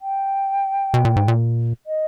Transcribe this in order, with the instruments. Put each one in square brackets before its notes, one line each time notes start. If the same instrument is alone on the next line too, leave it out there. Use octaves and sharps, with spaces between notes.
[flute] G5
[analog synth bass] B2
A#2
G#2
A#2
[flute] D#5